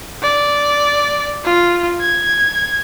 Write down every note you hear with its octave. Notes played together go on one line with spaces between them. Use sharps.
D5
F4
G#6